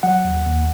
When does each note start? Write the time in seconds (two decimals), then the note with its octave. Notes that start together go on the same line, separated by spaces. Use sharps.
0.03 F#3 F#5
0.25 D#2
0.46 D#2